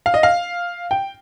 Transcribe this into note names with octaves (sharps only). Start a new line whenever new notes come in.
F5
D#5
F5
G5